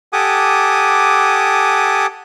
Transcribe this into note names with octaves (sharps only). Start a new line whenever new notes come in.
G4 A4 F#5 G#5 D6 D#6